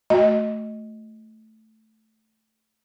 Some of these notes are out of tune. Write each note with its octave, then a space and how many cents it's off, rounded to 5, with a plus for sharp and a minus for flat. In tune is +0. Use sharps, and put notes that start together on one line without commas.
A3 +0 F#4 +0 D#5 +0